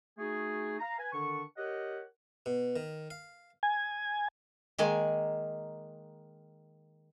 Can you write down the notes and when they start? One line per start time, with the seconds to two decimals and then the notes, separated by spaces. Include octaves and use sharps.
0.18 A3 D#4 F#4 G#4
0.79 F5 A#5
0.98 B4 G#5
1.12 D3 D#3 D4 C#6
1.57 G4 A#4 C#5 D#5 F#5
2.46 B2
2.76 D#3
3.10 F5
3.63 G#5
4.78 D#3 G#3 A#3 G#5